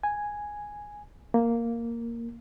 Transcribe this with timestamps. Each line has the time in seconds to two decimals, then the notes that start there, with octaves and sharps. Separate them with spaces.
0.03 G#5
1.34 A#3